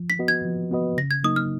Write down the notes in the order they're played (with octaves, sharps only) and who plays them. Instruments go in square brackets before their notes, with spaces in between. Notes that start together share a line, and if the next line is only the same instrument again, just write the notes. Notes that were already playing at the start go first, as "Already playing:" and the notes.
Already playing: [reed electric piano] F3
[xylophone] B6
[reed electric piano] B3 F#4 B4 D#5
[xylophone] G#6
[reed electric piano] F3
B3 F#4 B4 D#5
[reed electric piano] C#3 [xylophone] A#6
[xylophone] G#6
[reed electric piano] F#3 A#3 D#4 [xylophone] D#6
[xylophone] F6